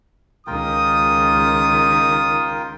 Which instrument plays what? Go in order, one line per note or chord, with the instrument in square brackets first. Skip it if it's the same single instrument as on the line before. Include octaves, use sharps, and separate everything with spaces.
[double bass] C#2 D#3 [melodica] F4 A#4 G5 [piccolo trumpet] D#6